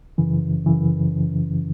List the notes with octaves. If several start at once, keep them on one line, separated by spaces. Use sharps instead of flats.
F#2 C#3 E3
F#2 C#3 E3